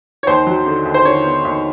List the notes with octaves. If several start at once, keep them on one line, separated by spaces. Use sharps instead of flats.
C#5
D#2 C5
F#3
D3
D#2
C5
D3 C#5
B3
D#2